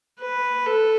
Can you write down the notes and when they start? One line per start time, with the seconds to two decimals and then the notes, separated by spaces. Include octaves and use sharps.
0.21 B4
0.66 A4